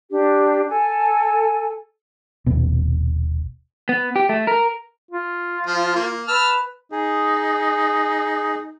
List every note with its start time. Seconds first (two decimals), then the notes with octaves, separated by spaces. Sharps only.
0.12 D4 G4
0.68 A4 G#5
2.46 D#1 A#1 B2 B3
3.89 B3
4.16 G4
4.29 A3
4.47 A#4
5.11 F4
5.66 F3
5.96 A#3
6.28 B4 A5 E6 F6
6.92 D#4 G#4